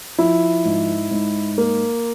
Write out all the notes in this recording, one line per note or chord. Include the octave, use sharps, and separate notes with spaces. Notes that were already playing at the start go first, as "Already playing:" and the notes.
F3 E4
G#2
G#2
A#3